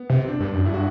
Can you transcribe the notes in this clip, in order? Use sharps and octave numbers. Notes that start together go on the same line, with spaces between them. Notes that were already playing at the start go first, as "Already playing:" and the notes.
Already playing: B3
C3
C4
D4
G2
F#2
G2 E4
F#4